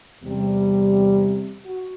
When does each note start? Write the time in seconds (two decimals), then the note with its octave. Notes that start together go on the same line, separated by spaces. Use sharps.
0.23 E2 C3 G3
1.66 F#4